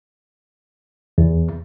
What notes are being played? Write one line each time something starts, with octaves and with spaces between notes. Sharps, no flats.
E2